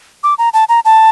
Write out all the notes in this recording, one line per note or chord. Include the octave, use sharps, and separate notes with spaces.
D6
A#5
A5
A#5
A5